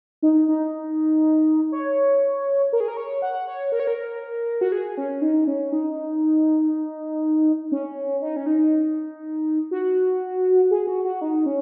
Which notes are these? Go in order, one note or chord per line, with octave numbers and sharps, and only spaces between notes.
D#4
D#4
C#5
A#4
G#4
A#4
C#5
F#5
C#5
A#4
C#5
A#4
F#4
G#4
C#4
D#4
C#4
D#4
C#4
D#4
C#4
D#4
F#4
G#4
F#4
F#4
D#4
C#4